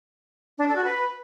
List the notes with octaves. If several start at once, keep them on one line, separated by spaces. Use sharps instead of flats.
D4
A4
F#4
B4